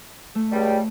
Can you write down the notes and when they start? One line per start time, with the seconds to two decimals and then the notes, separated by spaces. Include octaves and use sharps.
0.35 A3
0.52 C#2 G3